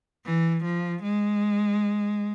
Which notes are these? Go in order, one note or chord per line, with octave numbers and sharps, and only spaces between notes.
E3
F3
G#3